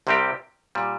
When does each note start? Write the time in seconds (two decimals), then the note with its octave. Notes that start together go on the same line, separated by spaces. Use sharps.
0.07 C2 C3 G3 C4 G4
0.75 A#2 G3